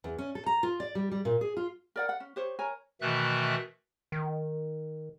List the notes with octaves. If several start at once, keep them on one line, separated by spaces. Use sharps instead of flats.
E2
C#4
A4
A#5
F4
D5
G3
G3
A#2
G#4
F4
A#4 D5 F#5
F#5
C#4
G4 C5 C#5
A#4 C#5 G#5 A#5
B2 D#3 E3 A3 E5 F#6
D#3